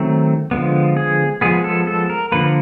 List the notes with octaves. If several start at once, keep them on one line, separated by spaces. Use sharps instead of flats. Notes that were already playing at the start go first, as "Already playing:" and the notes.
Already playing: D#3 F#3 A3 C4
D3 F3 G#3 B3
G#4
F3 G#3 B3 G#4
A4
A4
A#4
D3 F3 A#3 B4